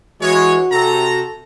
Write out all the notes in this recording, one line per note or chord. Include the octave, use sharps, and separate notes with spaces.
E3 G#3 F#4 C#5
C3 A4 A#5